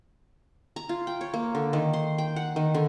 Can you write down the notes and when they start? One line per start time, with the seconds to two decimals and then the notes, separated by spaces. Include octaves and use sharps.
0.76 A#5
0.89 F4
1.07 G5
1.21 C#5
1.34 A#3
1.55 D3
1.73 D#3
1.93 C6
2.18 G5
2.36 F#5
2.56 D#3
2.74 D3